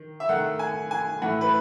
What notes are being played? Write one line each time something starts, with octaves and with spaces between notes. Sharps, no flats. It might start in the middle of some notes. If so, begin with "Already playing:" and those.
Already playing: D#3
E5
D#3 A3 F#5
G#5
G#5
A2 E3 A3 F#5
B4